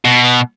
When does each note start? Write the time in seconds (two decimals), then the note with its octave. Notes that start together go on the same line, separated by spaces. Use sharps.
0.05 B2